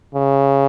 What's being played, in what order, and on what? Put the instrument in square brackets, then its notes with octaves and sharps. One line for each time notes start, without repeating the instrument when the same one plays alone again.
[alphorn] C#3